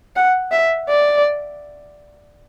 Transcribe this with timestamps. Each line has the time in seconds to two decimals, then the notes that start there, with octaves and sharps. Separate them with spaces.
0.16 F#5
0.52 E5
0.88 D5